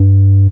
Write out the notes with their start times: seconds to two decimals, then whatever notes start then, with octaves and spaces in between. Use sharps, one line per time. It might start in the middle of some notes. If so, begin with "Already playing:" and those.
Already playing: G2